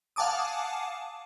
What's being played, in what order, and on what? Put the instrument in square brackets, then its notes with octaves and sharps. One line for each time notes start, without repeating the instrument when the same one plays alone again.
[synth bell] F5 F#5 G#5 A5 D6 D#6